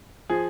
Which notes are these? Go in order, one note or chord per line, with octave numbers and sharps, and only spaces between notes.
F3 G#4